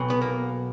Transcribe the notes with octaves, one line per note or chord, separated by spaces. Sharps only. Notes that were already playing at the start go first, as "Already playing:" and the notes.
Already playing: B1 B2
B3
A#3